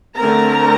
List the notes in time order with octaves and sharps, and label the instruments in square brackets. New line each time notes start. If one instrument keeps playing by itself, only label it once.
[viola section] D3 A3 C4 A#4 A#5